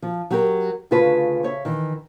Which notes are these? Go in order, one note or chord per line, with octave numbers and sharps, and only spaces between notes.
F3
F#3 G4 A#4
D2 C#3 F4 G#4 B4 A5
C#3 C#5 E5
D#3 E3